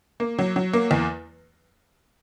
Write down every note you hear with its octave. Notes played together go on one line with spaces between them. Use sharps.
A#3
F#3
F#3
A#3
E2